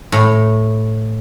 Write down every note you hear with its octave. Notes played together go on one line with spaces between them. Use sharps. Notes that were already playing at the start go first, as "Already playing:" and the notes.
A2